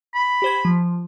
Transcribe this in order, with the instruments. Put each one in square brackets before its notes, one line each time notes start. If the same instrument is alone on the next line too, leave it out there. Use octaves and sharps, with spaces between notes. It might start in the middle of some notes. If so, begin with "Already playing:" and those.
[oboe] B5
[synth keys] G4 C5 G#6
F3